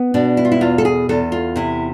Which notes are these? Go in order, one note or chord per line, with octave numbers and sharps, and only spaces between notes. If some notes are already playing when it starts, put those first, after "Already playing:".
Already playing: B3
B2 D4
E4
F4
E4
E2 F4
A4
G#4
E2 A4
F4
C3 E4